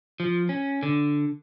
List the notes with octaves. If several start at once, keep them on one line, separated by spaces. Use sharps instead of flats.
F3
C#4
D3